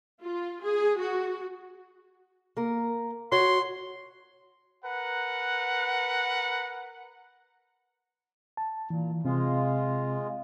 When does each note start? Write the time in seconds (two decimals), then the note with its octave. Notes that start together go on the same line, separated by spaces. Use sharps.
0.22 F4
0.62 G#4
0.99 F#4
2.57 A#3 A#4
3.32 F#4 C#5 C6
4.85 A#4 B4 F#5
8.57 A5
8.90 A#2 E3
9.25 C3 G#3 C4 F4